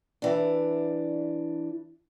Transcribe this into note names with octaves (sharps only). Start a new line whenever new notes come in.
E3 D4